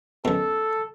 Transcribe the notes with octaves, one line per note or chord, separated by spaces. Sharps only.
F#2 B2 A4